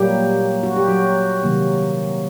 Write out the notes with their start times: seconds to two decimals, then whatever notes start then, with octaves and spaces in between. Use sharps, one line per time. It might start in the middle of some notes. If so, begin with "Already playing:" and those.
Already playing: A#2 F#3 G3 A#3 G4
0.63 F#4
0.76 G4
0.88 F#3 F#4
1.43 C3 D#3 F#3 A#3